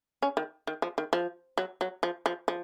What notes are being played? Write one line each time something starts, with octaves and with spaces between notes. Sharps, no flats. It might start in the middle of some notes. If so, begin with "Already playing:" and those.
C#4
D#3
D#3
F3
D#3
F3
F#3
F#3
F3
F3
F3